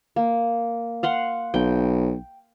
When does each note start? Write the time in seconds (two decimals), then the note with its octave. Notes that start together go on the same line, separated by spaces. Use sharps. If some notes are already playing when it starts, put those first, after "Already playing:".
0.16 A#3
1.03 F5 F#5 C6
1.54 B1 G5